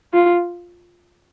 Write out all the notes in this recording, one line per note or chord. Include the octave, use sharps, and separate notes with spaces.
F4